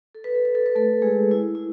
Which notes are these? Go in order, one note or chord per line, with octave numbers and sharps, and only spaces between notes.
A4
B4
A4
B4
A4
B4
A3 A4
G#3 G#4
E4
E4